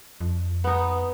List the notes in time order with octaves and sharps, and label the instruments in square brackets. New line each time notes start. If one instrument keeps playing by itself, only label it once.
[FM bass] F2
[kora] B3 D#4